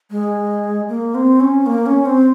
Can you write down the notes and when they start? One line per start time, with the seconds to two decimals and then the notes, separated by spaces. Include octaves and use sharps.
0.11 G#3
0.89 A#3
1.15 C4
1.40 C#4
1.66 A#3
1.86 C#4
2.06 C4